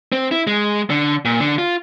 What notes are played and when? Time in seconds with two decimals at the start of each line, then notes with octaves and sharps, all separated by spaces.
0.12 C4
0.31 E4
0.47 G#3
0.90 D3
1.25 A#2
1.40 D3
1.58 F4